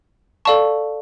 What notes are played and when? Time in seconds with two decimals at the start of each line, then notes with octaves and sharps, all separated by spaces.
0.45 A4 D5 F5 A5 C#6